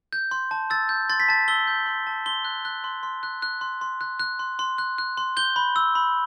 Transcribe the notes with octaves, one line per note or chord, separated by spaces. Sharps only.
G6
C6
A5
E6 A6
G6
C6 A6
B6
A5 A6
E6 G7
G6
C6
A5
C6 G7
F#6
F#6
C6
C6
F#6
F#6
C6
C6
F#6
F#6
C6
C6
F#6
F#6
C6
G6 G7
B5
E6
B5